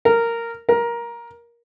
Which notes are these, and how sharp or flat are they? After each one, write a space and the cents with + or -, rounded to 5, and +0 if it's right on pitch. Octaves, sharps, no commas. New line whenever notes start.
A#4 -10
A#4 +15